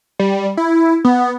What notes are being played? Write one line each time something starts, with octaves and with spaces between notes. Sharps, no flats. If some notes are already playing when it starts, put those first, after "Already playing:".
G3
E4
B3